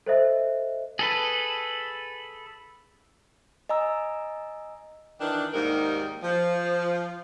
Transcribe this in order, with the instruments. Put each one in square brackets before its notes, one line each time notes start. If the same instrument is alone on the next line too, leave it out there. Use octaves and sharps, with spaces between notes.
[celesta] A4 C5 D#5 E5
[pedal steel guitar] G#4 A4 B4
[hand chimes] D#5 G#5 A#5 E6
[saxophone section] D#3 E3 D4
D#2 G#2 G3 D#4 A#4
F3